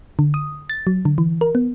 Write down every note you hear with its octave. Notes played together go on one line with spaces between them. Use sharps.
D3
D#6
A6
F#3
D3
E3
A#4
B3